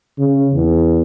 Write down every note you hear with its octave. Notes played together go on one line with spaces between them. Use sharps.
C#3
E2